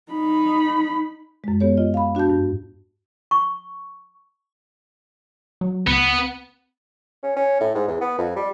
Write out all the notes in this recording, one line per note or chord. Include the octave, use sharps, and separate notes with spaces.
D#4 B5
F#2 G#3
B3 G4 A4 C#5
F4 D#5
F5 B5
D4 F#4 G4 A5 G6
G2
C#6
F#3
C#2 B3
C#4
C#4
A2
G#2
E2
B3
F2
G3